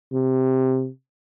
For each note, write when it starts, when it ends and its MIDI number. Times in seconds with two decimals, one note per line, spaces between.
0.13 0.88 48